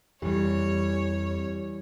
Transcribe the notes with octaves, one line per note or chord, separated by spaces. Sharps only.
F2 E3 G3 G4 C#5